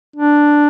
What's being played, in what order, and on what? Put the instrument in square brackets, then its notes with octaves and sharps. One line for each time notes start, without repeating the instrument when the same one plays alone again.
[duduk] D4